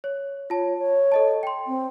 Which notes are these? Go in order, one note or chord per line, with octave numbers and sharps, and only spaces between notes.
C#5
F4 C#5 A5
C#5
A4 D#5 A5
G5 C6
C4